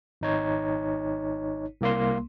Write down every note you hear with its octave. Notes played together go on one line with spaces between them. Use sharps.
G#1 D#4 C#5
C2 A#3 C6